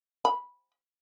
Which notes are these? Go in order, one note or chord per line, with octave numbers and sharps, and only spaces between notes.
B5